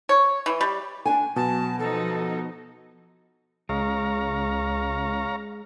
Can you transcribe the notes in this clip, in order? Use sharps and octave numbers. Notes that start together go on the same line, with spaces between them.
C#5
E3
G3
D4 G#5
B2 F#3 A5
F3 D#4 A4 D#5
C#2 G#3 C#5 F5 A#5